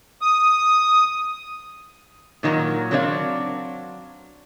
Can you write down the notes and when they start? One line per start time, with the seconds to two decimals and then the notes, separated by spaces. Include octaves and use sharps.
0.21 D#6
2.43 A#2 D#3 F#3 F#4 A#4
2.91 F#3 C4 D4 C#5 D5 F5